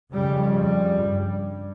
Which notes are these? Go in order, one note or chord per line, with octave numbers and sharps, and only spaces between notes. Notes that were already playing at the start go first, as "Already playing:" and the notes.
F2 C#3 G3
G3
G2